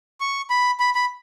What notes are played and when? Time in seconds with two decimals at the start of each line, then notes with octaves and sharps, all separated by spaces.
0.21 C#6
0.50 B5
0.80 B5
0.95 B5